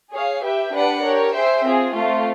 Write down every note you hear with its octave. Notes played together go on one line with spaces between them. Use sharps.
G#4 C#5 F5
G4 B4 E5 G5
D4 G4 B4 D5 F#5
G4 A#4 C#5
G#4 C5 E5 G5
C4 F4 G#4
A3 C4 F4